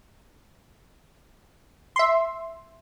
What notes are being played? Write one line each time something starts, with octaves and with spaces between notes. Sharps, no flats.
E5 C6